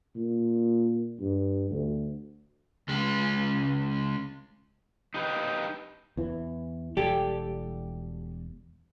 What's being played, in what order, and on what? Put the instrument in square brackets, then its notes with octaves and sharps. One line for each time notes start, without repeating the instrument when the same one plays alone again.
[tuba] A#2
G2
D2
[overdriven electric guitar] C#2 G#3
[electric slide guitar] D#4 G4 B4
[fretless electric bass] E2 E3
[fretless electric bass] E1 G3 [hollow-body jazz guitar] G4 A4